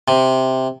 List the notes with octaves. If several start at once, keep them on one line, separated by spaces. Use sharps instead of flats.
C3